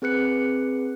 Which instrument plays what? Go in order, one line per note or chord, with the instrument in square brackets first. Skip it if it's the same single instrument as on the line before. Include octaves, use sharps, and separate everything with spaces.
[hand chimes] C4 G#4 B4 F#6 C#7